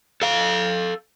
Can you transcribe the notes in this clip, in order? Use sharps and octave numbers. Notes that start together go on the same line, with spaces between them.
A4 F5